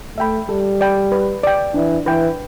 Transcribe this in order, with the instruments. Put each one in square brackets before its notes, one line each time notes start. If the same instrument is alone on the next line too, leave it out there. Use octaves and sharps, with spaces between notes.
[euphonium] A3 [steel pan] E5 G5 B5
[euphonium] G3 [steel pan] A4
[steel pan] D5 G5 B5
B4
D5 G5
[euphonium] E3 [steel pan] D4
[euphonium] E3 [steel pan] B4 G5